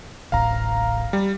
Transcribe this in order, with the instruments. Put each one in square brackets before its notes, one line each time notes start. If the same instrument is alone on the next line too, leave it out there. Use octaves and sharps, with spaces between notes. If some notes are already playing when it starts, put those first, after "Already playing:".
[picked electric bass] D1 A1 [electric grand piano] F5 A#5
[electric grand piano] G3